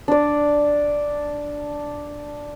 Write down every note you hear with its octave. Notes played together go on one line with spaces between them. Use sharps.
D4 D5